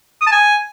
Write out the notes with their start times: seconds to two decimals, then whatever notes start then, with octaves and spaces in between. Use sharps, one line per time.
0.21 D#6
0.27 A5
0.32 G#5